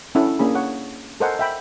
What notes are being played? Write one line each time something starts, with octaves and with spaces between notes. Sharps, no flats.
C#4 D4 E4 A4 F#5
A#3 C#4 D4 G#4 B5
C#5 F#5
A4 A#4 C5 D#5 F#5 G#5
E5 G5 B5